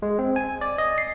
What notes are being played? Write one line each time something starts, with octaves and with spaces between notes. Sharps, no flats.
G#3
C4
G#5
D5
D#5
C7